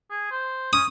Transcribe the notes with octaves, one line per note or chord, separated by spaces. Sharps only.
G#4
C5
C#4 D#6